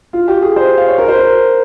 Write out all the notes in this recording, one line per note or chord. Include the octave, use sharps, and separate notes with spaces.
F4
G4
G#4
C5
F5
C#5
A#4
C5
A#4